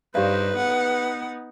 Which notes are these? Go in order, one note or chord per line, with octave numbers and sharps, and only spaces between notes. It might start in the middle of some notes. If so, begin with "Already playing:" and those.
G2 D#4 G4 B4 C5 D5 F5
B3 D#4 F#5